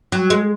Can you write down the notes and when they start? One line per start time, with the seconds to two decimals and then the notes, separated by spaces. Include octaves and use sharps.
0.12 F#3
0.30 G#3